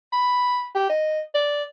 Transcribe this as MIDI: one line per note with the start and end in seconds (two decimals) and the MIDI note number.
0.12 0.66 83
0.75 0.88 67
0.89 1.20 75
1.34 1.63 74